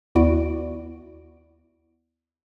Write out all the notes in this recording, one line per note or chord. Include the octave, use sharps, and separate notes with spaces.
D#2 B3 E4 F#4 D5 D7